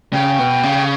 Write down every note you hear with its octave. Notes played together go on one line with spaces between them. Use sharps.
C#3 G5
B2
C#3